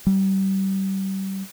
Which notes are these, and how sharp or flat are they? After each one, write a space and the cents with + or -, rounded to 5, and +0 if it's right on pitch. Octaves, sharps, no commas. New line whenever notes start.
G3 -30